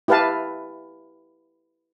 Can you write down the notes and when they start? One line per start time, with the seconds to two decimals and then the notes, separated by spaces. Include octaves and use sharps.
0.08 E4 G4 B4 F5 A5